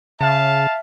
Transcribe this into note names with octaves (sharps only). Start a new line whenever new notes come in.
C#3 E5 F5 A5